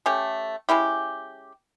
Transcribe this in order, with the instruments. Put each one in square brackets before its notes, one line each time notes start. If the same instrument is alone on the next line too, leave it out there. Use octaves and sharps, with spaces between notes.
[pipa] A3 C#4 G4 A4
G#3 C#4 E4 G4